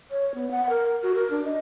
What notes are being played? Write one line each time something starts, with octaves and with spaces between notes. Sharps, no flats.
C#5
B3
F#5
A#4
F#4
A#4
D4
D#5